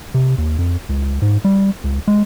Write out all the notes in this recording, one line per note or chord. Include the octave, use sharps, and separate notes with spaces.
C3
D#2
F2
C#2
G#2
G3
C#2
G#3